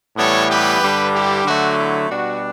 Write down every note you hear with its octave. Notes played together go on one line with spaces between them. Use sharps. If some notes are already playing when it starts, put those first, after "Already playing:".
A2 E3 G3 B3 A4 C#5
G4 B4
G2 D3 G3 D4
E4 G4
D3 F#3 A3 F#4
E4
B2 G3 D4 F#4